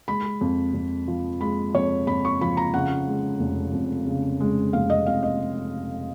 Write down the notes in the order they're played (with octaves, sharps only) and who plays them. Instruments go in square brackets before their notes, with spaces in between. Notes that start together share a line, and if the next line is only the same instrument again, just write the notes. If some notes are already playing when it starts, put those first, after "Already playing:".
[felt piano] G#3 B5
F2
F2
F3
G#3 B5
F2 C#5
F2 B5
C#6
F3 B5
A#5
C#3 F#5
G#3
F1
F2
C#3
G#3
F1 F5
D#5
F2 F5
D#5